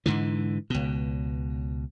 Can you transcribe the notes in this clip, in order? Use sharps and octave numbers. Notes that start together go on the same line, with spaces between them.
G#2 D3 E3
C#2 B2